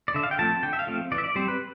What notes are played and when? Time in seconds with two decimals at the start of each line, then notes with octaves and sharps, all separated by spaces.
0.08 D5
0.14 D3 E5
0.23 F5
0.31 G5
0.39 F3 A3 C4 A5
0.63 D3 G5
0.73 E5
0.79 F5
0.87 F3 A3 C4
1.12 E3 D5
1.18 E5
1.24 D5
1.35 G3 C4 C5
1.48 B4